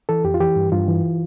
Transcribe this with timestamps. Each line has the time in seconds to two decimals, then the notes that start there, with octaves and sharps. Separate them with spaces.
0.09 E3 A4
0.24 F2 G4
0.34 F4
0.40 E3 G4
0.56 G2
0.72 G2 F4
0.88 E3